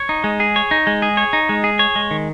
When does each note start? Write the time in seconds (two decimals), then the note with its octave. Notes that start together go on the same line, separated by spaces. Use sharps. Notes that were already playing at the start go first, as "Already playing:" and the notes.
Already playing: C#5
0.09 D#4
0.24 G#3
0.40 G#4
0.56 C#5
0.71 D#4
0.87 G#3
1.02 G#4
1.17 C#5
1.33 D#4
1.49 G#3
1.64 G#4
1.79 C#5
1.96 G#3
2.11 D#3